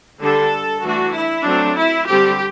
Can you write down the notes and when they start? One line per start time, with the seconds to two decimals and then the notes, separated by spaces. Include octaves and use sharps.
0.21 D3 G3 D4 A4
0.84 E3 A3 D4 F#4
1.14 E4
1.46 F#3 A3 C4 D4
1.78 E4
2.09 D3 G3 C4 G4